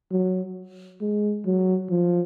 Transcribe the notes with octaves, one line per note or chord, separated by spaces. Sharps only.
F#3
G#3
F#3
F3